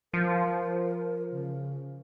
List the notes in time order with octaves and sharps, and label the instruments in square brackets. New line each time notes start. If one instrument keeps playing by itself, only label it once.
[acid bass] F3 [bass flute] A#4
[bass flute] C#3